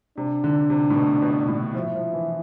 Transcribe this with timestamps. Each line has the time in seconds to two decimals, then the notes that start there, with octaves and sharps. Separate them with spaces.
0.17 C3 D4
0.44 D3
0.70 C3
0.90 A2
0.96 B2
1.22 B2
1.48 A2
1.74 F3 E4
1.95 F3
2.14 E3